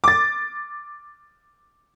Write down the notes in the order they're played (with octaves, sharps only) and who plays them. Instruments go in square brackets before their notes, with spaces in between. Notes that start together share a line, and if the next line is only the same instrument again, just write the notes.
[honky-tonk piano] D6 A6